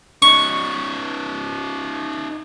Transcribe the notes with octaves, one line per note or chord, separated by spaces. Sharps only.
C#4 D#4 C#6